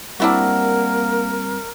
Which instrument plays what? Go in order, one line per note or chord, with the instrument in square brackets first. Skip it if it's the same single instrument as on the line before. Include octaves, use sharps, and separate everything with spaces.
[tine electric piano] G3 C4 [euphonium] A#3 [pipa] D4 E4 F#4 [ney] A#4